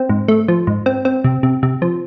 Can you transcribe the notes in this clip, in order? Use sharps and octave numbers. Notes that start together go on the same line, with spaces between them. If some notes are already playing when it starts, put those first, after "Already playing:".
Already playing: C4
G#2
A3
F3
G#2
C4
C4
C3
C3
C3
F3